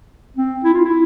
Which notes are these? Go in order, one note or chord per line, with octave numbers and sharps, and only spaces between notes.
C4
E4
F4
E4